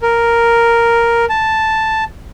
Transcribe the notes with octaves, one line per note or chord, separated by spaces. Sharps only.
A#4
A5